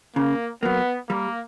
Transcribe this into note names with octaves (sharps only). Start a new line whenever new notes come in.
C#3 A#3
F#3 A#3 B3
G3 A#3